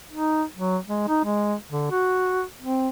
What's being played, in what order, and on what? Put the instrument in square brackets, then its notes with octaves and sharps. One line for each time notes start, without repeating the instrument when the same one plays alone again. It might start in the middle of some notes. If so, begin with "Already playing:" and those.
[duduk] D#4
F#3
G#3
D#4
G#3
D3
F#4
C4